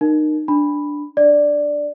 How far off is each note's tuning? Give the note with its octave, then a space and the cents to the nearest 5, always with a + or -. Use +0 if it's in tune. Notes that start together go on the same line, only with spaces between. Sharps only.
D#4 -30 A#4 +0
D4 +0 B5 +0
D4 +0 D5 +0